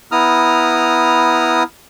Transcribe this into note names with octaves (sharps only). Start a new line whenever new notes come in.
B3 E4 A#5 D#6 F6